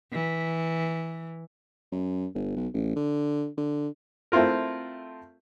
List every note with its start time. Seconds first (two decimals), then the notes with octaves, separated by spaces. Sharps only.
0.12 E3
1.92 F#2
2.35 G1
2.56 B1
2.74 A1
2.96 D3
3.57 D3
4.32 A3 C4 E4 F4 A#4